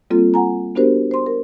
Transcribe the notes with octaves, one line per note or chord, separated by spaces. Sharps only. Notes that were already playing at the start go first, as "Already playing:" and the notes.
G3 A#3 C4 F4 A4
F#5 G#5 A#5
B3 D4 F#4 G4 A#4 C5
C5 C6
A#4